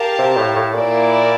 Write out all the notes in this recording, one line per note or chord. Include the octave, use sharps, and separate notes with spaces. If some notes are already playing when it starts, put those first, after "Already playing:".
Already playing: G4 A#4 F5 A5
C3
A2
A2
A#2 A#3 E4 A#4 D5